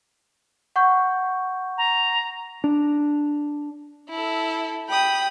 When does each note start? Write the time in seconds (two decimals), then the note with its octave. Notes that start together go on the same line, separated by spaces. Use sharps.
0.76 F#5 C#6 G6
1.78 A#5
2.64 D4
4.10 E4 A4
4.90 G5 B5 D#6